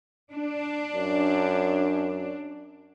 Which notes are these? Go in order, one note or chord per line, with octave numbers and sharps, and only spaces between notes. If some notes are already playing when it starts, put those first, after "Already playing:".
D4
F#2